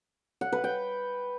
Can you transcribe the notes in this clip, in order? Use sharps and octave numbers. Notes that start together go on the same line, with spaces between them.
F#5
B4
G5